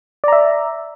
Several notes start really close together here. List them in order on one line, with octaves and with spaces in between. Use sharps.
D5 A#5 E5